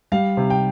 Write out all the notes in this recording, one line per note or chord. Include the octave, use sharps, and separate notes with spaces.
G3 F5
C3
G5